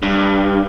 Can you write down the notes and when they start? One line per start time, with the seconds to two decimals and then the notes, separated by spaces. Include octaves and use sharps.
0.03 G2